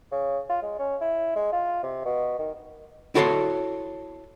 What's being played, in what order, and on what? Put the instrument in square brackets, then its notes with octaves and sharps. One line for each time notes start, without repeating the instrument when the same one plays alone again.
[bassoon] C#3
F4
G#3
C#4
E4
G#3
F4
C3
B2
D#3
[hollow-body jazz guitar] E4 F#4 A4 C#5 A#5 C6